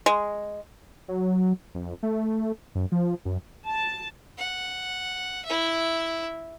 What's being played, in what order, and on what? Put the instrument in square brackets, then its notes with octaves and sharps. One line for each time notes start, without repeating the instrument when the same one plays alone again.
[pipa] G#3
[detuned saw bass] F#3
F2
A3
F#2
F3
F#2
[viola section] A5
[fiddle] F#5
E4 E5